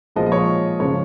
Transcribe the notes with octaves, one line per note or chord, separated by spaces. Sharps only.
A#2 F3 G#3 D#5
D#5
C#5
C#3 F3 G#3 C#5